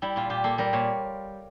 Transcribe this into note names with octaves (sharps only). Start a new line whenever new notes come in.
G3 E4
A#2 F4
A#2 G4
A#3 A4
G3 A#4
A#2 C#5